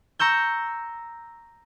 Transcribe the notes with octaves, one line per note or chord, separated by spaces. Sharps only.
A#5 C#6 E6 G6